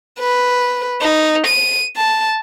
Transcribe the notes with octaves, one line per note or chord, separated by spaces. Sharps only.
B4
D#4
D#7
A5